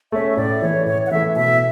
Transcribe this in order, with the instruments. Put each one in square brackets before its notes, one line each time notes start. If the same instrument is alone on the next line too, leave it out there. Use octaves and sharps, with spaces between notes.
[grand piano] A3 C#4 [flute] E5
[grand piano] A2 [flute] D5
[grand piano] E3 A3 [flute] C#5
[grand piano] A2 [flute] C#5
[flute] F#5
[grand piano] E3 A3 [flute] E5
[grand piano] B2 [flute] E5